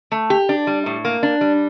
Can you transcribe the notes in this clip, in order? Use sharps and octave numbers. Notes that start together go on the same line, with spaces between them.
A3
G4
D4
G3
A2
A#3
D4
G3